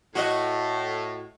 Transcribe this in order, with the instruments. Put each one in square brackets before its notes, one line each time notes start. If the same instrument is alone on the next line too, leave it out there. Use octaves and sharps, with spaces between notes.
[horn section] A2 [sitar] F#4 D#5